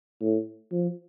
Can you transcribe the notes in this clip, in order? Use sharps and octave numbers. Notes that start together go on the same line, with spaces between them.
A2
F3